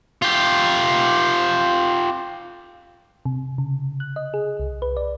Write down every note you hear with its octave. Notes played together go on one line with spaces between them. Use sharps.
F4 G4
C3
C#3
F#6
D#5
G#4
C2
B4
D5